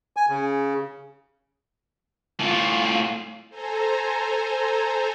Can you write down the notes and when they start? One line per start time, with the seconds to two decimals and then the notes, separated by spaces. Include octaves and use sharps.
0.17 G#5
0.29 C#3
2.40 A2 F4
3.50 A4 C5 G#5 A#5